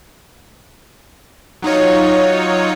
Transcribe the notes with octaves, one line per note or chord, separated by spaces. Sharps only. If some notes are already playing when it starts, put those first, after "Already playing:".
F#3 D#4 F4 C#5